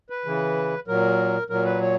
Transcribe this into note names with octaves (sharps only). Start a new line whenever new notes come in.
B4
C#3 E3
A#2 F#3 A#4
A#2 F#3 A#4
B4
C#5